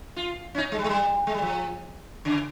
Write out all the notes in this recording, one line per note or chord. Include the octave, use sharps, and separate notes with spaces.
F4
C#4
D#4
G#3
G3
G#3
G3
G#3
G3
F3
C#3